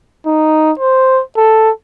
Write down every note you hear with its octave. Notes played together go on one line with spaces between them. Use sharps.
D#4
C5
A4